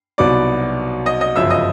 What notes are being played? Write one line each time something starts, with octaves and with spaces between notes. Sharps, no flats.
C2 B2 F#3 B3 D#4 D5 D6
D#5 D#6
D#5 D#6
G1 F#2 C#3 F3 E5 E6
D#5 D#6